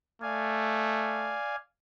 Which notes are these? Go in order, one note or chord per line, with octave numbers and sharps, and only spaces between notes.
A3 D5 F5 G#5